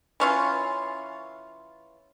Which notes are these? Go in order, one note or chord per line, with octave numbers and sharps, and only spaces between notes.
E3 C#4 F4